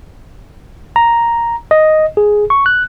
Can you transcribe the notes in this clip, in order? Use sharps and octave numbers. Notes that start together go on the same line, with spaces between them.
A#5
D#5
G#4
C#6
F#6